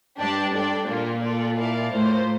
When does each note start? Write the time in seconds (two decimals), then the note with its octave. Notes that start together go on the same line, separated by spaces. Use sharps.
0.19 G2 D4 G4 D5 A5
0.53 G2 D4 A4 D5 G5
0.88 A#2 A#3 F4 A#4
1.22 F4 A4 D5
1.57 E4 A#4 D5 F5 A5
1.92 A2 A#3 F4 C5